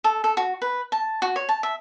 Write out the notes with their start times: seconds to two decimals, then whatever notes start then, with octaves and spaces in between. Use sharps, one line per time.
0.04 A4
0.24 A4
0.37 F#4
0.62 B4
0.92 A5
1.22 F#4
1.36 C#5
1.49 A5
1.63 E5